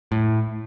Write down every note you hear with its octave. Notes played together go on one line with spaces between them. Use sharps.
A2